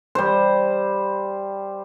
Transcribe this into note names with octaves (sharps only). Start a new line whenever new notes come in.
G3 C5